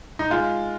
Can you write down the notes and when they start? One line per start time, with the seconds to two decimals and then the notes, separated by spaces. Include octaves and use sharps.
0.19 D#4
0.30 G#3 F4